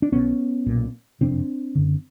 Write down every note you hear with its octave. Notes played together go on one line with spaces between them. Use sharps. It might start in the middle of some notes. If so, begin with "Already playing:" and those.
D4
B1 B2 B3 C#4
B1 A#2
F#1 F2 C3 C4 D4
F#1 F#2 D3